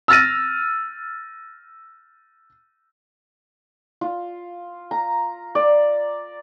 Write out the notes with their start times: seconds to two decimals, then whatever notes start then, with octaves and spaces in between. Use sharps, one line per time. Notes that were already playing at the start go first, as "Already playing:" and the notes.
0.08 E6 F6 A6 A#6 D#7
4.01 F4
4.91 A#5
5.55 D5